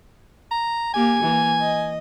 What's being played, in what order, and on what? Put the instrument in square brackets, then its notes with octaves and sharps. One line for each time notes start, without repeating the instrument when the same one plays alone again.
[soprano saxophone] A#5
[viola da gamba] A#3 G4 [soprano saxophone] G#5
[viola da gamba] E3 A#3
D#5